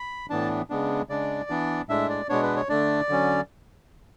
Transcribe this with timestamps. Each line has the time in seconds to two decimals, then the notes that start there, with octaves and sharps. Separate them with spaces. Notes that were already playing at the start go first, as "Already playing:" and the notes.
Already playing: B5
0.30 A2 E3 B3 D4 A5
0.70 C#3 G#3 B3 D4
1.09 C#3 G#3 D4 D5
1.50 E3 B3 D4
1.89 A2 G#3 D4 E5
2.09 D5
2.29 B2 G#3 B3 D4 C#5
2.43 B4
2.57 C#5
2.69 D3 A3 D4 D5
3.09 D3 F#3 C#4